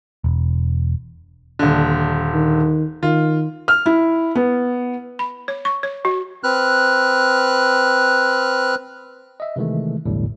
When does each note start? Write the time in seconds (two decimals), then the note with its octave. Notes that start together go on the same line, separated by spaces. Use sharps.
0.24 E1
1.59 D#1 D3
2.33 D#3
3.03 D#3 F4
3.68 F6
3.86 E4
4.35 B3
5.19 B5
5.48 C#5
5.65 C#6
5.83 C#5
6.05 F#4
6.44 C4 B4 F6 F#6
9.40 D#5 E5
9.56 C3 D#3 E3 G#3 A3
10.06 B1 E2 A2 D3 G3